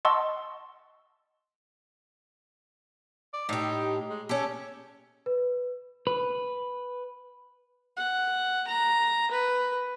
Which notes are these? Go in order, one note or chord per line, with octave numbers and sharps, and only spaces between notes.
D#5 F#5 A5 C6 C#6 E6
D5
A2 D#4 G4
G#3
C#4 G4 A4
B4
B4
F#5
A#5
B4